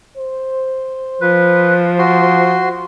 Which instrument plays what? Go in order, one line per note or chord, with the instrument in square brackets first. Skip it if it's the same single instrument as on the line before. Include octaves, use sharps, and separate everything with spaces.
[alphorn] C5
[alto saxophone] F3 [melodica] B4
[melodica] F#4 C6